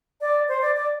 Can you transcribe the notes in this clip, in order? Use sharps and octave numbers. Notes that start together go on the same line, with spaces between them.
D5
C5
D5
D5